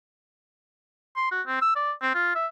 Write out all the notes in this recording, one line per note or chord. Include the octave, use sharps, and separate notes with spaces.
C6
F#4
C4
E6
D5
C4
F4
E5